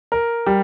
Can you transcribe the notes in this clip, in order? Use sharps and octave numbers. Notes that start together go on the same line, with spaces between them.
A#4
G3